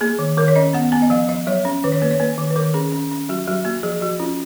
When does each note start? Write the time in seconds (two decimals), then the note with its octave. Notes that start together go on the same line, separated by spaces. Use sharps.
0.01 A#3 G#4
0.19 D#3
0.37 D#3 A#4
0.48 C#5
0.56 C#4 D#5
0.73 B3 F#5
0.92 B3 G#5
1.02 D#5
1.10 F3 F5
1.29 F3 D#5
1.47 F#3 C#5
1.65 C#4
1.84 D#3 B4
1.92 C#5
2.02 A#3 B4
2.11 C#5
2.20 A#3 B4
2.38 D#3
2.51 B4
2.56 D#3 A#4
2.74 C#4 G#4
2.92 C#4
3.11 C#4
3.29 F#3 F#4
3.48 F#3 F#4
3.65 A#3 F#4
3.83 F3 G#4
4.01 F3 F#4
4.19 C#4 F4